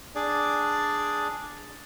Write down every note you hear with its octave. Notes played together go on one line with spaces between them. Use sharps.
D4 G#4 D5